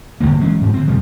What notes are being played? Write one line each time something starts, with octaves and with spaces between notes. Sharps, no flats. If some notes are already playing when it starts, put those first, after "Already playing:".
G1 E2 D3 A#3
E3 F#3 G#3 C#4
G#2 F3
D3 C4
F#2 C3 F3 G3